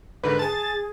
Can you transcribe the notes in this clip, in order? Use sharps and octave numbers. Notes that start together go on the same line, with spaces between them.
G#2 D3 D#3 B4
G#4 G#5 A5 A6